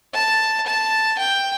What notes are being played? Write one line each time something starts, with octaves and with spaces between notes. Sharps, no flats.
A5
A5
G5